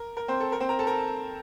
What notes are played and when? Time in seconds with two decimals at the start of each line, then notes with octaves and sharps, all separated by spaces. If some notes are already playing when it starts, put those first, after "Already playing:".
Already playing: A#4
0.17 A#4
0.28 C4 C5
0.40 A4
0.52 A#4
0.60 C4 C5
0.69 A#4 A#5
0.79 A4 A5
0.87 A#4 A#5